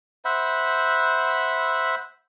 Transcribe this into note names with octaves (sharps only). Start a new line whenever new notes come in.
C5 E5 F#5 B5